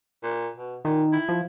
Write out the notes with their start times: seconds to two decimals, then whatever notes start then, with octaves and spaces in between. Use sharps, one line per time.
0.23 A#2
0.56 B2
0.85 A#2 D#3
1.12 E4
1.28 F3